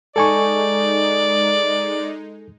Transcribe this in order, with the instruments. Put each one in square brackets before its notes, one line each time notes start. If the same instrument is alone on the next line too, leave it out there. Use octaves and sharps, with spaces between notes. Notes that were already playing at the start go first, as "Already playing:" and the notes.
[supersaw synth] G#3 D#4 [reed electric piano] A4 G#5 C#6 [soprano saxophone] D5